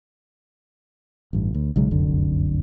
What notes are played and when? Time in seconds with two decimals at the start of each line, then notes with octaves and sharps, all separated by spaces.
1.33 A1 G2
1.54 D2
1.76 B1 C#3 F#3 G#3
1.91 F1 C2 F#2 D3